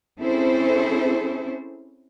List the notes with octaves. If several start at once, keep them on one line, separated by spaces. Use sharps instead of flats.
C4 C#4 E4 G#4 A4 C5